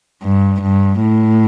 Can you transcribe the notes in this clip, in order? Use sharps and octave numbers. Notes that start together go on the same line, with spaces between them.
G2
G2
A2